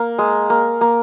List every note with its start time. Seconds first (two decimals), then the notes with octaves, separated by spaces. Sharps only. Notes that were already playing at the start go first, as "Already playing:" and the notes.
Already playing: A#3
0.18 G#3
0.50 A#3
0.81 A#3